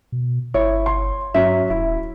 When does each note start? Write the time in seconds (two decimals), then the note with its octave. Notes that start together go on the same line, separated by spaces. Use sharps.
0.12 B2
0.54 G1 E4 C#5
0.86 C6
1.34 G2 F#3 C#4 E5
1.70 D#1 E4